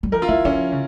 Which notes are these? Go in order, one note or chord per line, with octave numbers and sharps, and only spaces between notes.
G3
F3 A#4
F4
F3 E4
F3 C#4
C#3